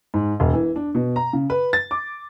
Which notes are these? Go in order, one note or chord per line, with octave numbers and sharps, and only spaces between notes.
G#2
E1
E3
D4
B2
A#5
C#3
B4
A6
D6